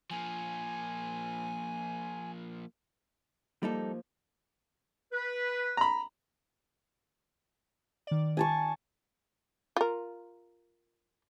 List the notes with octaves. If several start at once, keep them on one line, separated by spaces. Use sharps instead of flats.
F3 A#3 G#5
F3 G3 A#3 D#4 A4
B4
A#5 B5
D#3 D5
G#5 A5 C#6
F4 A#4